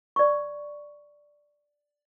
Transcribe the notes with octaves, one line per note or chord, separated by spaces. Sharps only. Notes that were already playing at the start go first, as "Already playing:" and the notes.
D5 C#6